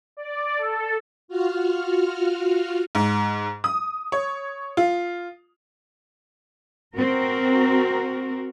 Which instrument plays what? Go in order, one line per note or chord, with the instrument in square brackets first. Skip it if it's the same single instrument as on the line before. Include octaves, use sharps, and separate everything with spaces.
[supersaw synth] D5
A4
[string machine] F4 F#4 F6
[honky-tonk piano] G#2
D#6
C#5
F4
[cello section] C4 F#4 A#4